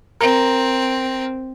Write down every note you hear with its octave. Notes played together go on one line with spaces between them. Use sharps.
C4 A#4